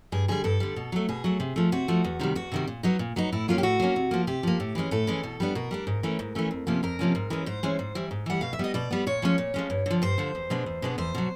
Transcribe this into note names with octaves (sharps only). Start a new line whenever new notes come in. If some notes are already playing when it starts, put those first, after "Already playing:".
G2 G#4
D3 G3 G#4
G2 A4
D3 G3
B2
F#3 A3
B2 G#4
F#3 A3
C3
F3 A3
C3 F#4
F3 A3
E2
C3 D#3 G3
E2 F#4
C3 D#3 G3
A#2
F#3 B3 D#4
A#2
F#3 B3 D#4
A2 E4
F#3 A#3 C#4 F4
G4
A2 F#4
F#3 A#3 C#4
C3
F3 A#3
C3 G4
F3 A#3
A2
E3 G#3 C#4
A2 A4
E3 G#3 C#4
B2
G3 B3 D4
B2 A#4
G3 B3 D4
G#2
E3 A3 C#4
G#2
E3 A3 C#4
F2
C3 F3 A#3 C#4
F2 A#4
C3 F3 A#3 C#4
G#2
E3 G#3 C#4
G#2 C5
E3 G#3 C#4
G#2
E3 G3
G#2
E3 G3 F#5
B2 F5
E5
G3 B3 D#5
B2 D5
G3 B3
A#2 C#5
F3 G#3 C#4
A#2
F3 G#3 C#4
G2
D3 F3
G2 C5
D3 F3
E2
B2 G#3 B3 D4
E2
B2 G#3 B3 D4
E2 C5
B2 F#3